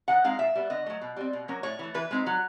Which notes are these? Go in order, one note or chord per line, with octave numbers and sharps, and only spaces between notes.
D#3 F#5
G#3 C4 D#4 F5
A#2 E5
G3 B3
D3 D#5
F#3 A3
B2
G3 C4
B2
F#3 A#3 C#4
A2 C#5
E3 A3
E3 B4
G#3 C4 D#4
F#3